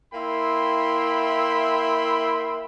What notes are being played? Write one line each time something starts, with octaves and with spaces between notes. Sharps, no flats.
A#3 E4 E5 G5 B5 C6